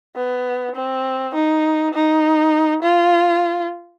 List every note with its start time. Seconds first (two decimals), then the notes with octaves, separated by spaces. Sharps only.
0.16 B3
0.75 C4
1.34 D#4
1.94 D#4
2.82 F4